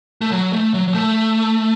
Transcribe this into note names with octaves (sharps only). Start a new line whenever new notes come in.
A3
F#3
A3
F#3
F#3
A3